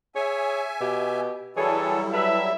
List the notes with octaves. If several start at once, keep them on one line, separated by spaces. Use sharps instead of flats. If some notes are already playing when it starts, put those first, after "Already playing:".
G#4 C#5 E5 G#5
B2 G4
E3 F#3 G3 E4 G#4 A4 C#5
A4 B4 E5